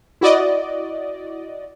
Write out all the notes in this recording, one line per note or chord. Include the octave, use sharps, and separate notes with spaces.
E4 F#4 D5 D#5